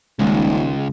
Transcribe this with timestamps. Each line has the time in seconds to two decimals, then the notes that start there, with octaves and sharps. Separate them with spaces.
0.19 D#1 C#2 D#3 G#3